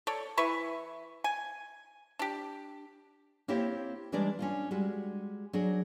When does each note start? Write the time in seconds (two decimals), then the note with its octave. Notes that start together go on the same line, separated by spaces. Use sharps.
0.07 A4 C#5 D5
0.37 E3 E4 B4 C#6
1.24 G#5
2.19 D4 G4
3.48 A#3 C4 E4 G4 C5 C#5
4.12 E3 G3 G#3 D4 A#4 D5
4.39 C#4 D4 F4
4.71 G3 G#3 F#4
5.53 F#3 D4 G#4 A#4